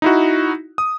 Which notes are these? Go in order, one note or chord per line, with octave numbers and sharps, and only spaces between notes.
D#4 E4 F#4
D#6